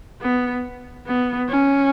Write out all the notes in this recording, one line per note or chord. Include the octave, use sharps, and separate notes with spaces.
B3
B3
C#4